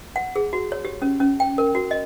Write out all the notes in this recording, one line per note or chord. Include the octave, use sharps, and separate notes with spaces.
F#5
G#4
F#4
C#5
G4
C#4
C#4
G5
A#4
F#4
D#5